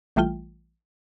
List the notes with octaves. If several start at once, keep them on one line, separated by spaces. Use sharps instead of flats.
A#1 E3 G3 A3 F4 G5